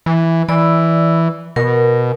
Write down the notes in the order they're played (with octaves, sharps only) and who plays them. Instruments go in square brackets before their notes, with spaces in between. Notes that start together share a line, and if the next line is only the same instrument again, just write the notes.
[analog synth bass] E3
[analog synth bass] E3 [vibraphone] D5 B5 E6
[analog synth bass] B2 [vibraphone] A#4